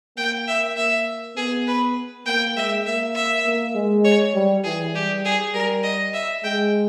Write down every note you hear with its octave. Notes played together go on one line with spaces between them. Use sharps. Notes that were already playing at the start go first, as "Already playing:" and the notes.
A#3 G5
E5
A#3 E5
B3 G#4
B4
A#3 G5
G#3 E5
A#3 E5
E5
A#3
G#3
C#5
G3
E3 G#4
G3 G4
G#4
G3 A#4
D#5
E5
G#3 G5